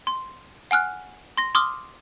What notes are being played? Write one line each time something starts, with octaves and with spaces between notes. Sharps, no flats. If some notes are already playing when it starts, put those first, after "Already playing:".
C6
F#5 G#5 F6 F#6
C6 A#6
C6 D6 D#6 F6